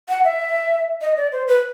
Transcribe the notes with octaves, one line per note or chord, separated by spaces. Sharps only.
F#5
E5
D#5
D5
C5
B4